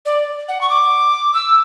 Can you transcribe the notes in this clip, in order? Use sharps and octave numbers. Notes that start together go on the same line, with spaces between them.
D5
F#5
C#6
D6
E6